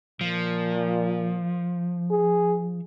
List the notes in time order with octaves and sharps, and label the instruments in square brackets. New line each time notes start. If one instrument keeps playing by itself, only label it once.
[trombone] A#2 [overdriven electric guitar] F3
[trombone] G#4